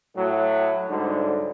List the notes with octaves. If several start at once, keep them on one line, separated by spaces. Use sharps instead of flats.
A2 F#3
D2 G#2 D3 F#3 G3